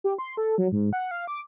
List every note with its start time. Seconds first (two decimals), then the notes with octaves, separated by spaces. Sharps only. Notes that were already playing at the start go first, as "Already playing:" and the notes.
0.04 G4
0.18 C6
0.37 A4
0.58 F#3
0.72 G#2
0.93 F#5
1.11 F5
1.27 D6